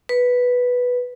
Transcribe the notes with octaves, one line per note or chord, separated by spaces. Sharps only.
B4